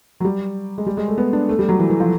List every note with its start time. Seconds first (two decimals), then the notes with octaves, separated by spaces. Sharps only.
0.20 F#3
0.24 G3
0.78 G#3
0.86 G3
0.97 G#3
1.08 A3
1.18 B3
1.33 D4
1.49 A3
1.59 G3
1.69 F#3
1.79 E3
1.90 E3
2.00 F3